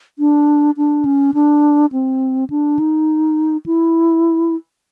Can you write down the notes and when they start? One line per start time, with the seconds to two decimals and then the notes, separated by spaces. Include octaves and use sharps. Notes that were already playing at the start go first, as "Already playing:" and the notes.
0.19 D4
0.77 D4
1.05 C#4
1.34 D4
1.92 C4
2.50 D4
2.79 D#4
3.66 E4